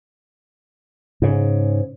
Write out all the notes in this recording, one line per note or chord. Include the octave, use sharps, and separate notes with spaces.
G#2 C#3